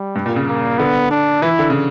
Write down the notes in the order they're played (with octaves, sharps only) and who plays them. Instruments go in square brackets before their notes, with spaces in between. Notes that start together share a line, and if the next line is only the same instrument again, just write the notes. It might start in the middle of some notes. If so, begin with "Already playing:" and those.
Already playing: [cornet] G3
[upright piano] G2
A#2
C#3
[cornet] A#3
[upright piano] D3 [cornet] B3
[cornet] D4
[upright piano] E3 [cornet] E4
[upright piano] D3
C#3